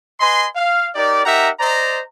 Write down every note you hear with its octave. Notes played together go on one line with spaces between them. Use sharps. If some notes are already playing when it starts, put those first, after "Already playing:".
B4 D#5 G#5 C6
F5
D#4 G4 A#4 D5
D#4 G4 A#4 E5 F#5 A#5
C5 D5 D#5 A#5